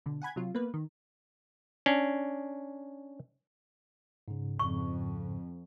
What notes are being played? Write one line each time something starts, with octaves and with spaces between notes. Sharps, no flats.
B2 D3
F#5 G#5 B5 G#6
C3 F#3 F4
A#3 B3 B4
D#3
C#4 D4
G#2 C#3
F2 C#6